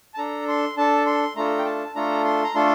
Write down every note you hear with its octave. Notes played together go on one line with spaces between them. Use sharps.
A5
D4 A4 A#5
C6
D4 A4 A5
C6
A3 D4 F4 A4 A#5
G5
A5
A3 D4 F4 A4 A#5
C6
A#5
A3 D4 F4 A4 C6